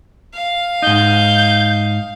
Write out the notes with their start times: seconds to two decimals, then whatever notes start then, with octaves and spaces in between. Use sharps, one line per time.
0.33 F5
0.82 G#2 D#4 G6